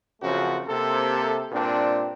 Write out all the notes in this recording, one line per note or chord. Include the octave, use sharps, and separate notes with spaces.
F#2 C#3 F3 A3 C4 F#4
C3 A#3 A4
G2 A#2 C4 D4